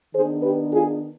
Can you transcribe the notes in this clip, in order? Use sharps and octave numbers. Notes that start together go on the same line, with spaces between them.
D#3 B3 D4 G#4 C5
G4 B4
F4 G#4